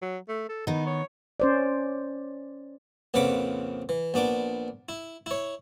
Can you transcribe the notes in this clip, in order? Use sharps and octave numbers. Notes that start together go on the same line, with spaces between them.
F#3
A3
A4
D#3 B3 D#4
C#5
C#4 C5 D5
A#1 F2 C#3 B4 F#5 D6
E3
A#1 B3 D4 D6
E4
E4 C#5